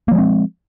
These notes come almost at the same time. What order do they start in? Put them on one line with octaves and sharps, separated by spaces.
A#3 F3 G#3 C4